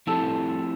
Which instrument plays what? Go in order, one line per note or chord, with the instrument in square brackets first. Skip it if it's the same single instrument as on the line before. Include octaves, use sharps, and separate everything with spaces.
[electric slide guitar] F3 A3 C4 E4 G4 [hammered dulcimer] A4